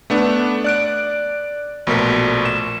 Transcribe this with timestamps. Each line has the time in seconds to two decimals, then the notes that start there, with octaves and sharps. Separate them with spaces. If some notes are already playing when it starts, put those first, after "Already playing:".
0.10 A3 B3 D4
0.64 D5 F#6 D7
1.87 A#1 B2 A3 A#4 B6
2.45 E7